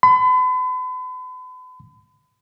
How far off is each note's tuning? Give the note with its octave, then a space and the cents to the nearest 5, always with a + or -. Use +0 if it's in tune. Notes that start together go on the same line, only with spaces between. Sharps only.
B5 +40